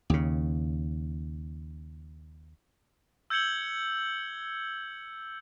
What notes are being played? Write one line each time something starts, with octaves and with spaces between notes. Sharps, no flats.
D#2 C#3
E6 G6 G#6 C#7 F#7 G7